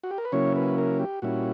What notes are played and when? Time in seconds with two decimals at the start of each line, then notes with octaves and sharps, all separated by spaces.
0.03 F#4
0.11 G4
0.18 A#4
0.25 B4
0.32 C#3 F#3 A#3 C#4 E4 C#5
0.56 B4
0.78 A#4
0.99 G4
1.22 A#2 G3 C#4 E4 F#4